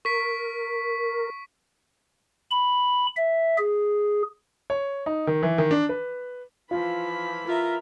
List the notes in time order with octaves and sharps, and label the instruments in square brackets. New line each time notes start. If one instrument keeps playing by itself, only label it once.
[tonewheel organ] A#4 [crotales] C#6 B6 D7
[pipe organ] B5
E5
G#4
[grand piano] C#5
D#4
D#3
E3
D#3
D4
B4
[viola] E3 B5 [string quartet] F3 [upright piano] F4
[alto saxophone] F4 [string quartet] A#4 E5 A#5